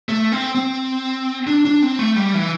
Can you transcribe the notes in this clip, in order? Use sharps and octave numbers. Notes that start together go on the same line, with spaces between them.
A3
C4
C4
D4
D4
C4
A3
G3
E3